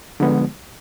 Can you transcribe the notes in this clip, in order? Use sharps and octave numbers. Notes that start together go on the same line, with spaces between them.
D3 F3 G#3 B3